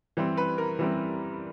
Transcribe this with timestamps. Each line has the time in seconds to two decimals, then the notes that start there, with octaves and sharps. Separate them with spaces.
0.17 E3 G3 C4
0.37 B4
0.58 A#4
0.79 E3 G3 C4